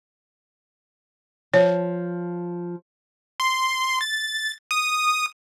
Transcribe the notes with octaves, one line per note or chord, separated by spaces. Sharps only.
F3 C#5
C6
A6
D#6